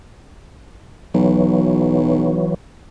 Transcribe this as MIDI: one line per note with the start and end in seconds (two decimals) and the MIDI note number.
1.14 2.51 35
1.14 2.54 52
1.14 2.54 54